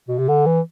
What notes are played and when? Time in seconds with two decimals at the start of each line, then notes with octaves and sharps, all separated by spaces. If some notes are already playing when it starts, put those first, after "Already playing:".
0.08 B2
0.18 C3
0.28 D3
0.46 E3